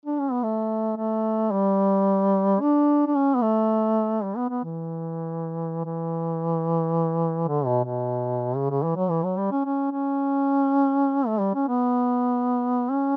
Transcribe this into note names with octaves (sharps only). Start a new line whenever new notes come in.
D4
C#4
B3
A3
A3
G3
D4
D4
C#4
B3
A3
G3
B3
B3
E3
E3
D3
B2
B2
C#3
C#3
E3
F#3
E3
F#3
G3
C#4
C#4
C#4
A3
G3
C#4
B3
C#4